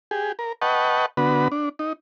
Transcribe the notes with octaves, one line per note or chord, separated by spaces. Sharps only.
G4 G#4
A#4
B4 D#5 F#5 G5 A5 C#6
D3 B3 F#4 B4
D4
D#4